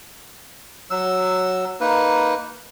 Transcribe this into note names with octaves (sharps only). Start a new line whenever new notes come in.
F#3 E6
A#3 D#4 B4